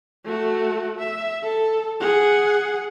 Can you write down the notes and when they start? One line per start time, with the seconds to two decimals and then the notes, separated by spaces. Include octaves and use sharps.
0.25 A3 F#4
0.99 E5
1.43 A4
2.00 G#4 F#5